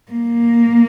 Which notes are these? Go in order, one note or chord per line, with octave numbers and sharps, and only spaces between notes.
A#3